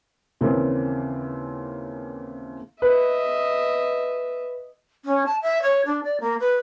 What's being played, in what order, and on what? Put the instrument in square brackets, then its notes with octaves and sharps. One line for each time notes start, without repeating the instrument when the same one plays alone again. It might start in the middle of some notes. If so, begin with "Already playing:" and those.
[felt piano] D#2 C#3 E3 A#3 C4
[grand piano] B4 [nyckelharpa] D#5 E5
[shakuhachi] C#4
A5
E5
C#5
D4
D5
A#3
B4